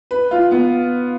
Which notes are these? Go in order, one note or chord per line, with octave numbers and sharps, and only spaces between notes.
B4
F4
B3